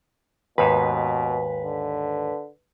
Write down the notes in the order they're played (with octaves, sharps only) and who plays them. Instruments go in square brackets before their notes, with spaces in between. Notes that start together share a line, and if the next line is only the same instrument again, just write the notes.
[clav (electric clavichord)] D#2 G#2 [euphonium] B2 [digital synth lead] B4
[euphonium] D3